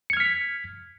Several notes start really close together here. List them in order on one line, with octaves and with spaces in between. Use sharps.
C#7 G#6 F6 B6